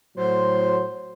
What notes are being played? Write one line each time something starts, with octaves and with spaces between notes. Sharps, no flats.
A2 F#3 C5